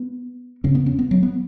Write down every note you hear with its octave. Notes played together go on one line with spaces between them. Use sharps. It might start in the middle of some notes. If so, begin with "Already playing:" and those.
Already playing: B3
E2 C#3 C#4
B3
C#4
B3
F#3
B3